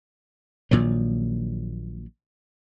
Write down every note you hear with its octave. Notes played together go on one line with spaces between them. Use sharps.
A#1 A#2 D#3 F#3